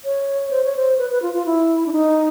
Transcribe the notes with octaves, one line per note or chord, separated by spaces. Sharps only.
C#5
C5
C#5
C5
B4
B4
F4
F4
E4
D4
D#4